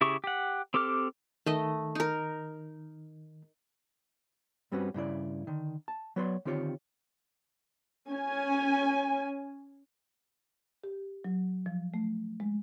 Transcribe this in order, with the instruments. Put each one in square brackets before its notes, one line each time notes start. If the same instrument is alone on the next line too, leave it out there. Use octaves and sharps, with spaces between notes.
[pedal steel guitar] C#3 E4 G4 G#4 C#6
G4 F#5
C4 G4 A4 D6 F6
[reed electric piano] D#3 [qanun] A3 D#5
[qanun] D#4 A#4
[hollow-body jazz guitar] G2 G3 C4 C#4 F#4 B4
G2 C#3 E4 D5
D3 D#3
A5
F#3 B3 B4 C#5 D5 C6
D3 D#3 C4 F4 G4 C#5
[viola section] C#4 G#5
[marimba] G4
F#3
F3
A3
G#3